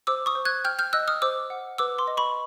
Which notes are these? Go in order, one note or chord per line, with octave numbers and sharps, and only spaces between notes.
C5 D6 E6
C#6 D#6
C5
F#6 G#6
G5 F6 G6
F6 G6
D#5 E6 F#6
D#6 F6
C5 D6 E6
F#5
B4 D6 E6
C6 D6
D#5
B5 C#6